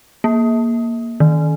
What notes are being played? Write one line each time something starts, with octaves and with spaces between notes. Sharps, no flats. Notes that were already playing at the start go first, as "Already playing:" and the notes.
A#3
D#3